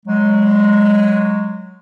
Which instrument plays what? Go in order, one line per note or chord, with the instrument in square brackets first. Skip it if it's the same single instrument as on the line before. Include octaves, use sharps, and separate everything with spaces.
[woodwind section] F#3 G#3